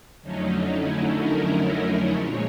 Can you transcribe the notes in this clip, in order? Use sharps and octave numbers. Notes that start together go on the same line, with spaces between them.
F2 D3 F#3 A3 C#4 D#4
E4
A#4
A#2 F3 G#3 C#5